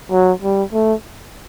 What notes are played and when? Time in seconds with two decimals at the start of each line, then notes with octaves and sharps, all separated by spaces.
0.11 F#3
0.42 G3
0.72 A3